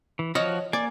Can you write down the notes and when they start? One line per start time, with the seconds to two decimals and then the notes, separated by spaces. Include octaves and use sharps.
0.19 E3
0.35 F3 F#4 C#5 D#5 F6
0.73 A#3 D5 G#5